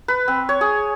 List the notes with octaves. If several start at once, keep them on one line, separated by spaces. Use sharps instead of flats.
B4
C4
C#5
G#4